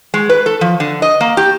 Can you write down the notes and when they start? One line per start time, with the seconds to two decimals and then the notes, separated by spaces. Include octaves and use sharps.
0.14 G#3
0.29 B4
0.46 A4
0.61 F3
0.80 D3
1.02 D#5
1.21 A#3
1.37 G4